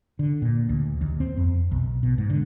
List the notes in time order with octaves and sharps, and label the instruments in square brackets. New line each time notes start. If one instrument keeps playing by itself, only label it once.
[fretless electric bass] D3
A#2
D2
D#2
C4
F2
B1
B2
G#2
D3